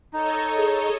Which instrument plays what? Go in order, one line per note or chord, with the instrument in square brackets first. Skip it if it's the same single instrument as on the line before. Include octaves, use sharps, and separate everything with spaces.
[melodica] D#4 [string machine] A4 C#5 D#5
[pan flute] G#4